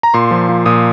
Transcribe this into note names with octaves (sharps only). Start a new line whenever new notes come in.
A#5
A#2 C6
F3
F3
A#2 D#6